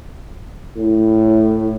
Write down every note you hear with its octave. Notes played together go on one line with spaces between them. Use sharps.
A2